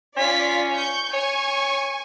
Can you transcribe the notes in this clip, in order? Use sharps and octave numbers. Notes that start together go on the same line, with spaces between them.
C#4 F4 D5 B6
C#6 G6
C#5 G#5 C#6